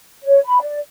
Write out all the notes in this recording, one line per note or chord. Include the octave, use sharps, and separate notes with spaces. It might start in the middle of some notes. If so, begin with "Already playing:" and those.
C#5
B5
D5